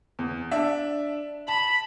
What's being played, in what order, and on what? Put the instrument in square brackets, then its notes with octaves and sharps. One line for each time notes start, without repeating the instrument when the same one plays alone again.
[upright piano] E2
D4 E5
[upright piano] A5 [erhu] B5